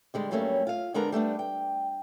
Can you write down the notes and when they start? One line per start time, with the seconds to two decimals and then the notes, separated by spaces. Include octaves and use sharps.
0.14 D3 G3 G#3
0.31 G2 F#3 G3 A3 A#3 C#4
0.67 F4 F5
0.94 D3 G#3 B3 D4 A#4 A#5
1.12 G3 A3 B3 D4
1.39 G5